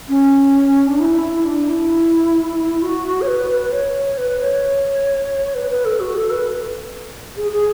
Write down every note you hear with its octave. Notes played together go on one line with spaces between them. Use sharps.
C#4
D4
E4
E4
D4
E4
F#4
C#5
B4
B4
C#5
B4
C#5
B4
B4
A4
F#4
A4
B4
G#4
G#4